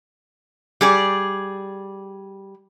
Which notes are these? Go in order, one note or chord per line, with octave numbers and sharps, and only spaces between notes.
G3 G#4 D5